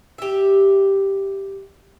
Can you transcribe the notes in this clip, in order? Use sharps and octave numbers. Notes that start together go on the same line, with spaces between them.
G4 E5